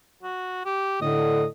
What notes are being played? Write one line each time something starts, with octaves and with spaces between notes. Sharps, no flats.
F#4
G4
A2 D3 D#5